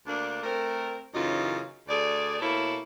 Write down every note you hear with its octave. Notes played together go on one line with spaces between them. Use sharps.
D2 A#3 D4
A3 C4 A#4
F#2 C#3 E3 D#4 F4
D2 A3 G#4 D5
B2 A#3 E4 A4 C#5